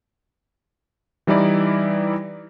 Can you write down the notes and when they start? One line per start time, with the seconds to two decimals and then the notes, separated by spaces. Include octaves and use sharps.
1.27 E3 G3 D#4 E4 D5